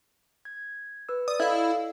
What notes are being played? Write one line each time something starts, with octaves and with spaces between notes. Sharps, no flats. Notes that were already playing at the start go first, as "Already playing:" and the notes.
G#6
B4 E6
D5 D#6
E4 A4 D#5 F5